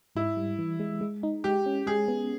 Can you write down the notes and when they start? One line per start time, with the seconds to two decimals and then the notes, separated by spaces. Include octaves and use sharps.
0.15 G#2 E4
0.37 G3
0.59 E3
0.80 G#3
1.01 G#3
1.23 D#4
1.44 G#3 G4
1.66 C#4
1.87 G#3 G#4
2.08 B3